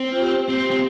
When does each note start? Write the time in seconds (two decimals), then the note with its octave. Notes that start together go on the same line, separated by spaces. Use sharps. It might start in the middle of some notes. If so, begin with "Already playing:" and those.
Already playing: C4
0.12 F4
0.20 G4
0.48 C4 G4
0.71 C4